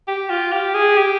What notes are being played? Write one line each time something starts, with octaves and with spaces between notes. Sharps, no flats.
G4
F4
G4
G#4
G4